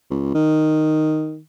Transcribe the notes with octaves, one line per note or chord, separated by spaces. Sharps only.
C#2
D#3